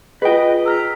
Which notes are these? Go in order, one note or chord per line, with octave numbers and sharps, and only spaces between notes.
F4 G#4 B4 D#5 G5
A#5 E6 F6 B6